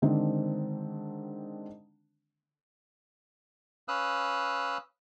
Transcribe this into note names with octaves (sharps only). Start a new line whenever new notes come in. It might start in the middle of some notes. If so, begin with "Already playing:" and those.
D3 D#3 G#3 C4 D4 C5
C#4 B4 F5 D#6 E6 F#6